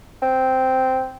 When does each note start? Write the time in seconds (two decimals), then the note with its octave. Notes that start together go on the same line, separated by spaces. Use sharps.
0.22 C4